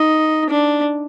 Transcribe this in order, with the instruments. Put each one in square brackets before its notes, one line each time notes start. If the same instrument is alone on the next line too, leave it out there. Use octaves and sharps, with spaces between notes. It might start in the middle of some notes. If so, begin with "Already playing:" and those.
Already playing: [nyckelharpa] D#4
D4